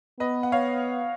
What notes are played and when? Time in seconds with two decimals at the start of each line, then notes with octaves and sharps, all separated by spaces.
0.20 B3 B4 D#5
0.43 F#5
0.52 C#5 F5